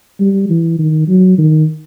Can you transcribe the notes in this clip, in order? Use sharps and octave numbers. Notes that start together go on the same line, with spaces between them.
G3
E3
D#3
F#3
D#3